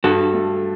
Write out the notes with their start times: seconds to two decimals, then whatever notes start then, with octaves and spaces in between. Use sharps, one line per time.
0.04 G2 F#4 A4
0.34 A3